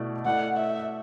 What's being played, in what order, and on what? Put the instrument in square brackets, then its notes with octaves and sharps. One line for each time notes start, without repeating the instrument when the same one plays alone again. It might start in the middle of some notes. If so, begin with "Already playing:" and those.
Already playing: [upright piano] B2 A3 E4 D5
[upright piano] A3 E4 D5 [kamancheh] F#5
[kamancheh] E5